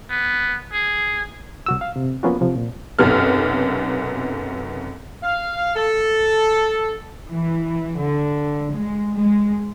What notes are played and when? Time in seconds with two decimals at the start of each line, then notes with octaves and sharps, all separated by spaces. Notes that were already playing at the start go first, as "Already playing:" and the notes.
0.10 B3
0.72 G#4
1.66 C2 F#4 E6
1.81 F5
1.96 C3
2.23 F3 A#3 B3 C#4 F4 F#4
2.41 C3 F3
2.55 A#2
2.99 B1 F#2 C3 B3 A4 F6
5.22 F5
5.76 A4
7.31 E3
7.99 D3
8.75 G#3
9.17 G#3